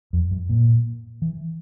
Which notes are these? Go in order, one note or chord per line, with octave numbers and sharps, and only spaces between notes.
F2
F#2
A#2
E3